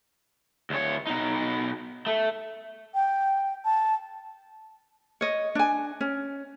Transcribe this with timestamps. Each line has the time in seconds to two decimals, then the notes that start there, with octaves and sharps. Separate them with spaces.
0.70 D2 C#5
1.07 B2 D#4
2.06 A3
2.94 G5
3.65 A5
5.21 C#5 D#5
5.55 D4 G#5
6.01 C#4